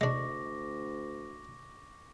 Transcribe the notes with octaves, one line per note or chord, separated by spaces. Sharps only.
D2 G#3 D4 C#6 D6 A#6